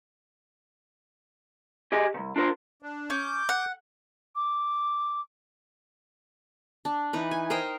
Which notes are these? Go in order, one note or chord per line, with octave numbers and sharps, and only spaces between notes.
G4 G#4 D#5
C2 A#2
D4 F4 A#4 C5
D4
C#4 D6 G6
F#5
D6
D4
E3 D#4 B4
G#5
A#4 C5 D#5 G5